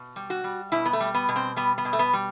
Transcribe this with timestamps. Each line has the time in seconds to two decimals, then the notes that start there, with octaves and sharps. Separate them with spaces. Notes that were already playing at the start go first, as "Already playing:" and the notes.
Already playing: B2
0.16 G3
0.30 F#4
0.44 G3
0.72 B2 E4
0.86 B3
0.93 A3
1.00 G3
1.14 B3
1.29 B2
1.36 C4
1.56 G3 B3
1.78 B3
1.85 B2
1.93 A3
1.99 B3
2.13 G3